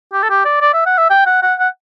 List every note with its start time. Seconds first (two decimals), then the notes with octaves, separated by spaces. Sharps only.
0.13 G4
0.23 A4
0.30 G4
0.45 D5
0.61 D5
0.74 E5
0.86 F#5
0.98 E5
1.10 G5
1.26 F#5
1.43 F#5
1.59 F#5